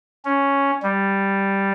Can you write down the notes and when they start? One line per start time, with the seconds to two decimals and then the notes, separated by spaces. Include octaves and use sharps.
0.25 C#4
0.82 G3